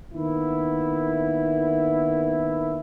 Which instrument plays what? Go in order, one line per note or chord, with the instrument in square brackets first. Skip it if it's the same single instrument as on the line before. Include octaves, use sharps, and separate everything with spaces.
[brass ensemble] D#3 A#3 B3 E4